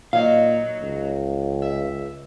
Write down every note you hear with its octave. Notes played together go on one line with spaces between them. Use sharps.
A#2 F#3 D#4 F5
C#2
E5